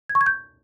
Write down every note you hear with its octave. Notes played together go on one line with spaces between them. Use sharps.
G#6
C#6
G#6
G6